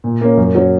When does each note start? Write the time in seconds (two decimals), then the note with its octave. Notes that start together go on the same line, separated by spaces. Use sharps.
0.04 A#2
0.21 A#3 C#4
0.37 F#2
0.55 F#3 C#4